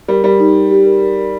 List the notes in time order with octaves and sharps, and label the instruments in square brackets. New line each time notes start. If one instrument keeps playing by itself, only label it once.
[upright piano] G3 [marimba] A#4
[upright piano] G3 [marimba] A#4
[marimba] D#4
A#4
G4
A#4
A#4
A#4